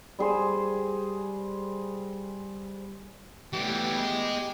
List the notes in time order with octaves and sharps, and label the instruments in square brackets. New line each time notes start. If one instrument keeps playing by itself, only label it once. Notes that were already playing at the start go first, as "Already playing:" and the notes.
[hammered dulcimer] G3 G#4 C5
[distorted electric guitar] E3 G3 [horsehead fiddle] A3 B3 [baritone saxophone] G4
[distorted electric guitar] G#4 D#5